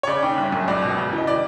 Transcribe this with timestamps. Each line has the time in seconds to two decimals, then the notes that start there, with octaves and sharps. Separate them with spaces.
0.03 C#5
0.07 C#3 D5
0.22 D#2
0.38 G1
0.52 F#2
0.68 C#2 D5
0.82 B2
0.98 C#3
1.13 E3
1.18 D#5
1.27 D5